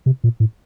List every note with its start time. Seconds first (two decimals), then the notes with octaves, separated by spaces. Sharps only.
0.06 C3
0.24 A#2
0.40 A2